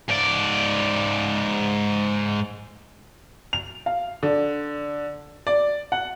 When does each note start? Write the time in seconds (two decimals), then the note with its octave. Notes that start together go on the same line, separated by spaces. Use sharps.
0.08 G#2 D5
3.53 F7
3.86 F5
4.23 D3
5.47 D5
5.92 F#5